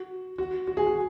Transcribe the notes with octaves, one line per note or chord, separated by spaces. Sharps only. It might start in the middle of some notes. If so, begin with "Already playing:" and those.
Already playing: F#4
F#4
F#4
G#4
F#4